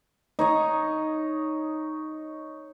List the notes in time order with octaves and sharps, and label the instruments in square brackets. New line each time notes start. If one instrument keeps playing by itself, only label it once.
[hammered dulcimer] D#4 C#5 D#5